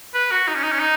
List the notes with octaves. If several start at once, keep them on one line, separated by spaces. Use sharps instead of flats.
B4
F#4
D#4
C#4
D#4
C#4
D#4